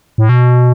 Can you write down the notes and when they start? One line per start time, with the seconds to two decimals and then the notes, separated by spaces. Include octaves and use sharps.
0.18 A2
0.29 B2